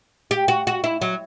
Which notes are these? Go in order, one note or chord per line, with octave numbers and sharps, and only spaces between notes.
G4
F#4
F#4
E4
F#3